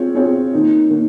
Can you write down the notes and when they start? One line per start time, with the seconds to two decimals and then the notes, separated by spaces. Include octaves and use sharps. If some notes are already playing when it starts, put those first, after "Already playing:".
Already playing: C4 F4 G#4 C#5
0.15 C4 F4 G#4 C#5
0.53 D#3 A#3 D#4
0.90 D#3 A#3 D#4